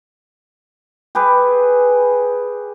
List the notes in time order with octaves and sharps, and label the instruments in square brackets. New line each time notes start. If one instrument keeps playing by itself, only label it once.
[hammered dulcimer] G4 G#4 B4